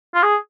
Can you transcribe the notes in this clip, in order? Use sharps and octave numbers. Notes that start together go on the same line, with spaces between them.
F4
G#4